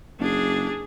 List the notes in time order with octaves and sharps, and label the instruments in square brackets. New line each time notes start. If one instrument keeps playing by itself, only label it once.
[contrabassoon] F#1 [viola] D4 G#4